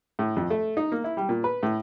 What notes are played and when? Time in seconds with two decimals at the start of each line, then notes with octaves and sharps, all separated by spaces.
0.19 A2
0.36 F2
0.50 A3
0.77 D#4
0.92 A#3
1.04 E4
1.17 G3
1.29 A#2
1.44 B4
1.63 A2